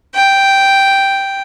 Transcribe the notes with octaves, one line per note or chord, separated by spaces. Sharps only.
G5